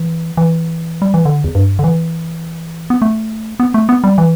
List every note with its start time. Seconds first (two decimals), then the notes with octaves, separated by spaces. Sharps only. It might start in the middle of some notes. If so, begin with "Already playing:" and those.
Already playing: E3
0.37 E3
1.02 G3
1.14 E3
1.25 D3
1.44 E2
1.55 G2
1.79 D3
1.84 E3
2.90 B3
3.02 A3
3.60 B3
3.74 A3
3.89 B3
4.04 G3
4.18 E3